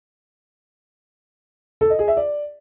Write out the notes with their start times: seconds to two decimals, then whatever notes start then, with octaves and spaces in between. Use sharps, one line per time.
1.81 A4
1.90 D#5
1.99 G#4
2.08 E5
2.17 D5